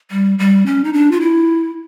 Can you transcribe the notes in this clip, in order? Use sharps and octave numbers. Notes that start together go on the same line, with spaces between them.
G3
G3
C#4
D#4
D4
F4
E4